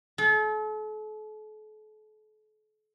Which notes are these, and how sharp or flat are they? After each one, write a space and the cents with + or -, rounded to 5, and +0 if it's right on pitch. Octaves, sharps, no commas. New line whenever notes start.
A4 -40